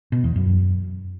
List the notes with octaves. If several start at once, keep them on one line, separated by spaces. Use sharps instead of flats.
B2
E2
F#2